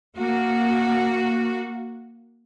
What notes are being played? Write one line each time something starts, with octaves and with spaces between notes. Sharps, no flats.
A#3 F#4